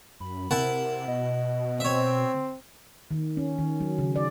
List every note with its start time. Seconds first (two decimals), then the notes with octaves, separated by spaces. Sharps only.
0.20 F#2 B5
0.51 C3 E4 A#4 F#5 A5
1.08 B2 D#5
1.80 C4 C#5 E5
3.11 D#3
3.37 C#4
3.58 D#3
3.80 F#3
3.98 C#3
4.16 D5